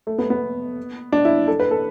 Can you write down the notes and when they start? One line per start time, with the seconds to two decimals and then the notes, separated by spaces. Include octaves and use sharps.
0.07 A3
0.19 B3
0.30 B3
1.12 D4
1.25 E4
1.47 A4
1.60 B4
1.71 A4